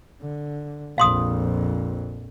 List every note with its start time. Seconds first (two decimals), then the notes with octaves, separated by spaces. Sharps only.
0.22 D3
0.98 A#1 F2 F5 C6 D#6